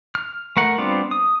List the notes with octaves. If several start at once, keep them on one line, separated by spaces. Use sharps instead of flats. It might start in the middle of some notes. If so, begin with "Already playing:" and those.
F6
A3 A#4 F#5
G3 B3 C4 D4 F4
D#6